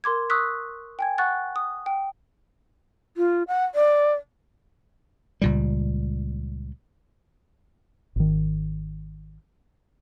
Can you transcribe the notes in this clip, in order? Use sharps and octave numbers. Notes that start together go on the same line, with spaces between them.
A#4 C6 D6 G#6
C#6 D#6 E6 F#6 B6
G5 G#5 G#6
F#5 C#6 F#6 A6
D#6
G5
F4
F#5
D5
C#2 A#2 G3
G#1 D#3